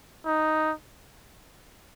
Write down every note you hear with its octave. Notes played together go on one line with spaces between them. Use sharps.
D#4